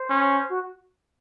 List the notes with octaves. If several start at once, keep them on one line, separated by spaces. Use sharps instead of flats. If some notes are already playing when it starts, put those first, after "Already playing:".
Already playing: C5
C#4
F#4